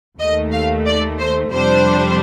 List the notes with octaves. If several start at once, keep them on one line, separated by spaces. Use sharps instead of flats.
D#2 D#3 A3 D#5
F5
D5
C5
F2 C3 G3 D4 C5